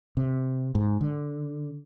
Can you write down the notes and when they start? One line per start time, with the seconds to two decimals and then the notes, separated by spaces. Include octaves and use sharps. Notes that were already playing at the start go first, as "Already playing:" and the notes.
0.17 C3
0.75 G#2
1.01 D3